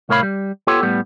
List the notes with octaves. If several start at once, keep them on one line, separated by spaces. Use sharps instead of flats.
C2 A2 A#4 C#5 F5 B5
G3
B3 F4 G4 A4 C#5
A2 G3 B3